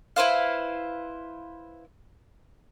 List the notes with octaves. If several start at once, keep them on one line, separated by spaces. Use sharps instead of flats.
E4 B4 C5 F5